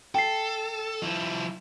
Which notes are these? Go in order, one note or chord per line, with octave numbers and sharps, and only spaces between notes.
A4 G5 C7
F3 E4